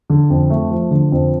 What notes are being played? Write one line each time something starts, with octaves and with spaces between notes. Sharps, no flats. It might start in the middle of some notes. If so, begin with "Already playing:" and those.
D3
F2
A3
F3
D3
F2